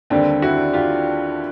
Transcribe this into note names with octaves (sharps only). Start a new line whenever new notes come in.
D#2 D3 G3 C4 D4
E4 F#4
F4 G4